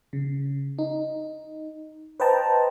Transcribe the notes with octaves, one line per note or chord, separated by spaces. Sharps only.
C#3
D#4
B4 C5 D#5 G5 A5 A#5